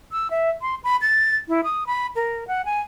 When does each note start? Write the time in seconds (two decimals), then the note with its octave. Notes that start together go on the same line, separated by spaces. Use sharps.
0.12 E6
0.31 E5
0.62 C6
0.84 B5
1.01 A6
1.48 E4
1.64 D#6
1.87 B5
2.16 A#4
2.48 F#5
2.65 G#5